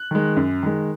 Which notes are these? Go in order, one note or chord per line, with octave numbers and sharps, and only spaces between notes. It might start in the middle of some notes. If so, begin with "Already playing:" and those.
Already playing: F#6
D#3 G#3
F#2
D#3 G#3